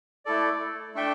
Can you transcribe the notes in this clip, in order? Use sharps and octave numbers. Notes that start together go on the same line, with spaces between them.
A3 E4 A4 D5
A3 D4 A4 E5 G5